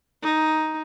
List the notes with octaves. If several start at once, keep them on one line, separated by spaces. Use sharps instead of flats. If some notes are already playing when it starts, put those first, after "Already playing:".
D#4